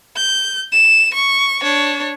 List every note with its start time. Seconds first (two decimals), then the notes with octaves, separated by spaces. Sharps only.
0.16 G6
0.72 E7
1.14 C#6
1.63 D4 C#5